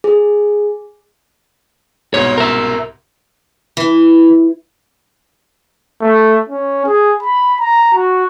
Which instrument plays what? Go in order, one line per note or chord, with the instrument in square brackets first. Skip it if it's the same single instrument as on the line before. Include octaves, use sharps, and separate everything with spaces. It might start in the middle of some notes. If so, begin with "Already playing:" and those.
[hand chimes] G#4
[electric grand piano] C2 G#2 B2 [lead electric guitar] C#5
[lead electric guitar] A#4 E5
[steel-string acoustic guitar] E3
[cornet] A3
C#4
G#4
B5
A#5
F#4